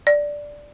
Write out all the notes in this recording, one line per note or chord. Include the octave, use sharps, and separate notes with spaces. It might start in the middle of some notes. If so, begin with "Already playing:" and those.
D5